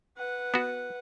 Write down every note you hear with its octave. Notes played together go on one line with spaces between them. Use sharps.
B4 F#5
B3 F#4